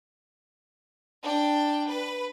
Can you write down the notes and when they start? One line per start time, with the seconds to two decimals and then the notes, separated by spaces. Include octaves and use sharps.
1.22 D4 G5
1.86 B4